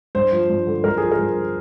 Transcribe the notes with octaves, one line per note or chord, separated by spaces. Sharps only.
G2 C5
F3
G2
D3
G2 A#4
F3 G#4
A#4
G2
D3